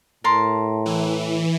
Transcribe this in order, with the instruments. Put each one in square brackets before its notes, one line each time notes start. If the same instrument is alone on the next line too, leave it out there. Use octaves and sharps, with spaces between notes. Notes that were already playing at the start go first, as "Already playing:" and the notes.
[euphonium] A2 [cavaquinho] A#4 A5 C6
[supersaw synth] E3